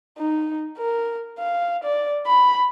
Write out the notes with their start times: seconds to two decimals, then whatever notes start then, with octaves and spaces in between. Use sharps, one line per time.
0.18 D#4
0.78 A#4
1.39 F5
1.84 D5
2.27 B5